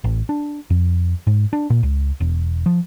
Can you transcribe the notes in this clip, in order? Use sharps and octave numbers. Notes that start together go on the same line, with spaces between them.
A1
D4
F2
G#2
D4
A#2
C#2
E1
F3